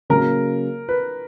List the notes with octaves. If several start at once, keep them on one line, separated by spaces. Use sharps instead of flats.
C#3 F#3 A#3 A#4
B4